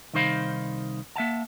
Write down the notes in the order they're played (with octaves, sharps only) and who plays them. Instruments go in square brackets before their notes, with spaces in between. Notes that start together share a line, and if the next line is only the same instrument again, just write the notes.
[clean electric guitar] C2 D#3 D#4 C5 F5 B5
A#3 E5 F#5 A5